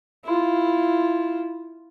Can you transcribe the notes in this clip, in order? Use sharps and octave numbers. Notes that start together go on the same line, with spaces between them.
E4 F4